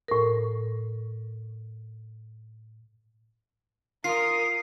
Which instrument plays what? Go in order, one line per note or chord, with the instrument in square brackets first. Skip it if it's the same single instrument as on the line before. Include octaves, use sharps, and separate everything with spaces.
[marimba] A2 A#4
[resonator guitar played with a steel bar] F4 [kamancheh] A#4 D#6 [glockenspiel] C7